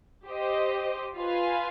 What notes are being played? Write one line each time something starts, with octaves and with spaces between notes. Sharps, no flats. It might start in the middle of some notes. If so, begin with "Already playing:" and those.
G4 C5 D#5
F4 B4 F5 G#5